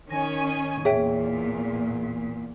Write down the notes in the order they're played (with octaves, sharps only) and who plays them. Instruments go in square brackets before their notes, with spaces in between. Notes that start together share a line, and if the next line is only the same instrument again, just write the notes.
[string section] D#3 C#4 G#5 [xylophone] A#6
[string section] E2 A#2 [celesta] G#4 [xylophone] C#5 E5 G5